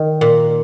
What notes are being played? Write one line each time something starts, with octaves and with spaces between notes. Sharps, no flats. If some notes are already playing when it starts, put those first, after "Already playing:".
Already playing: D#3
A#2